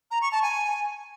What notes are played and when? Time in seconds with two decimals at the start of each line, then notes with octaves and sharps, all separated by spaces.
0.11 A#5
0.22 C#6
0.32 A5
0.43 G#5